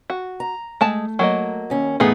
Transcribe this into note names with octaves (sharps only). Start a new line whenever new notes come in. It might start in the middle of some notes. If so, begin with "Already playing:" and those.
F#4
A#5
G#3 A3 A5
F#3 A#3 D#5
D#2 C#4
E2 A2 A3 B3 D#4 G#4